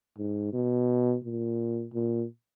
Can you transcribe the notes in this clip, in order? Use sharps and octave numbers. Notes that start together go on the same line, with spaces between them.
G#2
B2
A#2
A#2